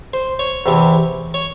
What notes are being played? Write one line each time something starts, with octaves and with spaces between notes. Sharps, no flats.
C5
C#5
E2 C3 E3
C#5